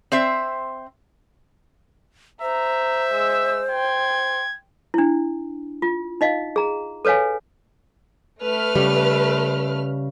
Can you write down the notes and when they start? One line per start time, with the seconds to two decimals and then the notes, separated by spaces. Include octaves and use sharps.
0.12 C4 C5 E5
2.42 C5 E5 A#5
3.11 G#3 E6
3.71 G5 C6 G#6
4.94 D4 E4
5.82 F4
6.21 D#4 D#5 F5
6.56 G#4 A#5
7.05 A4 B4 C#5 F5 G#5
8.42 A3 B4 F6
8.75 C#3 G3